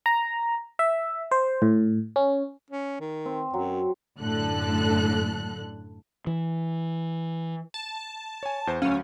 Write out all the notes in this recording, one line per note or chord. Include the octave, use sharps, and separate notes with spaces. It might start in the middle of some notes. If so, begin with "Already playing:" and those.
A#5
E5
C5
A2
C#4
C#4
D#3
C4
F#2 F#3
F#2 A2 D3 A4 F#6
E3
A5
C#5 G#5
E2 C5
D2 F#3 C#4 F5